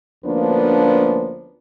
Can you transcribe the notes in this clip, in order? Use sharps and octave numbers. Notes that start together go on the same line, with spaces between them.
D2 F3 A#3 B3 C#4 D4